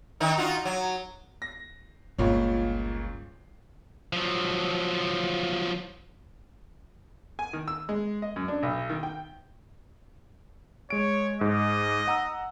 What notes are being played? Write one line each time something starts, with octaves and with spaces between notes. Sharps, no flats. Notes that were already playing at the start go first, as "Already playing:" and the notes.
D#3 D#4
D#4 F4 F#4
F#3
A#6
G1 C#2 A#2 C#5
F3 F#3
G#5
D#3
E6
G#3
D#5
F#2
D4
B1
D#3
G5
G#3 C#5 D7
G#2 D#5
F#5 A#5 E6